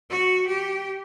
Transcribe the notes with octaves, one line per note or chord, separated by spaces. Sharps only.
F#4
G4